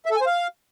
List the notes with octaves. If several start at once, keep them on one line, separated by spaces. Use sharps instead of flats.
E5
A4
G#5
C5
F5